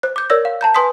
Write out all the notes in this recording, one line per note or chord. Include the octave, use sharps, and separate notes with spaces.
C5 F#6
D6 G6
A#4 C#5 D5 E6 A#6
F5
A5 A#5 G6
B4 G#5 C6 D#6 B6